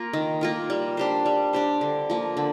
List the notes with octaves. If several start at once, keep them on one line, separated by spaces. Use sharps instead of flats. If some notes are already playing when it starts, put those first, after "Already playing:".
Already playing: A#3 F4 A#4
D#3
A#3 F4 A#4
G3
D4 G4 C5
G3
D4 G4 C5
D3
F3 A#3
D3